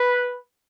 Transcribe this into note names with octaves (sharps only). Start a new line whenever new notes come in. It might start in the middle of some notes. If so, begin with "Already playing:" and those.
Already playing: B4